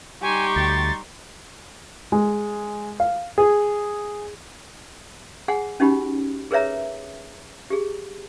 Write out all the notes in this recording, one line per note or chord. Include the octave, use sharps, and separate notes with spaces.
G3 D#4 G4 G#5 C6 C#6
D2 A6
G#3
F5
G#4
G#4 F#5 G#5
C#4 D#4 F#4 G4 B5
G#4 A#4 B4 C#5 E5 A#5
G4 G#4